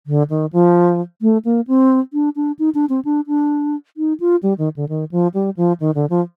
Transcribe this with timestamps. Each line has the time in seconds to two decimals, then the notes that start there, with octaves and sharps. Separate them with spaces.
0.07 D3
0.30 D#3
0.53 F3
1.22 A3
1.45 A#3
1.67 C4
2.13 D4
2.36 D4
2.59 D#4
2.75 D4
2.89 C4
3.05 D4
3.27 D4
3.97 D#4
4.20 F4
4.43 G3
4.58 D#3
4.76 D3
4.89 D#3
5.11 F3
5.34 G3
5.57 F3
5.80 D#3
5.95 D3
6.10 F3